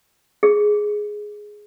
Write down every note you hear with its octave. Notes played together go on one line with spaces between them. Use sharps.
G#4